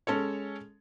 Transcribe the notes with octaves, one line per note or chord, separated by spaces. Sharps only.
G#3 C#4 A4 C#5